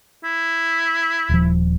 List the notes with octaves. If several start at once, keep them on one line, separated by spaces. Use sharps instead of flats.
E4
D#1 F3